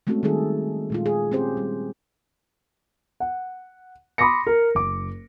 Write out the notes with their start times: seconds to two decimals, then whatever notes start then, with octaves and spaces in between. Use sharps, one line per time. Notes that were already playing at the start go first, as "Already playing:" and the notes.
0.07 G#3 A3 C4 C#4 F#4 A4
0.23 D#3 G3 D#4 G#4 A4
0.90 A#2 G#3 F4
1.06 G#4
1.32 C4 C#4 G4 G#4 C5
1.57 G3
3.20 F#5
4.18 B5 C6 D6 D#6 A#6 C#7
4.47 A#4
4.75 F#1 D6